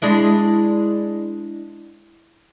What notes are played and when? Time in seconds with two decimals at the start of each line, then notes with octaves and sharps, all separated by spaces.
0.02 G#3 D4 E4